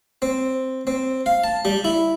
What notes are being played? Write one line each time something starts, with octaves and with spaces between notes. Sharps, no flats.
C4
C4
F5
A5
G3
E4